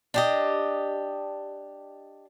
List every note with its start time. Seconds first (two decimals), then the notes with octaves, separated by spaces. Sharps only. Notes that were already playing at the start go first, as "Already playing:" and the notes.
0.14 D4 G4 D#5